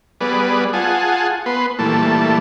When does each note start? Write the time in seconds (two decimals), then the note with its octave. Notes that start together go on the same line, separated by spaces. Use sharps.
0.21 G3 B3 G#4 B4 D5
0.73 F4 G#4 F#5 G#5 A5
1.46 B3 B4 C6
1.79 A#2 E3 G3 A3 A5